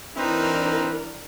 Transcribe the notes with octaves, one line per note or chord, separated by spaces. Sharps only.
E3 C4 D4 D#4 A#4 B4